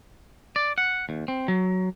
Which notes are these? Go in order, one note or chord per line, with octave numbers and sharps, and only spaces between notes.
D5
F#5
D#2
C4
F#3